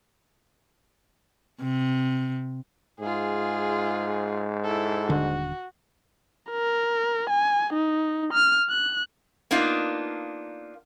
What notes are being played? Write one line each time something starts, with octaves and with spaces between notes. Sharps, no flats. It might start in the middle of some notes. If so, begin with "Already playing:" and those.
C3
G#2 F4 G#4
E4 A4
D#1 D3 D4 F#4
A#4
G#5
D#4
F6
F#6
A#3 B3 D4 D#4 F4